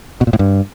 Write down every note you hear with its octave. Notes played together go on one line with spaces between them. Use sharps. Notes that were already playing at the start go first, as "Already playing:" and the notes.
B2
A#2
A2
G2